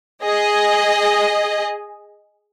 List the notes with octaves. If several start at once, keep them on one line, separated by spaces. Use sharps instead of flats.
G#4 D#5